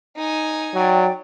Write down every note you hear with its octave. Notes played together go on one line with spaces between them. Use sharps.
D#4 G#5
F#3 D5 G5